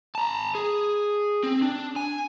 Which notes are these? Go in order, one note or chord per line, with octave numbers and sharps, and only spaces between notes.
A5 A#5
G#4
C4
D4
G#5